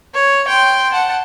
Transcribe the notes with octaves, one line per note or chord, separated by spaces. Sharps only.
C#5
G5 C6
F#5 A5